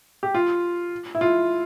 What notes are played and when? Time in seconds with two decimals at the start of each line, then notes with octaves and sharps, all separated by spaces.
0.23 G4
0.35 F4
1.15 E4
1.21 F4